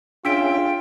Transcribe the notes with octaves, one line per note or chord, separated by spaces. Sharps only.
C#4 D4 F4 G#4 E5 G5 B6 D7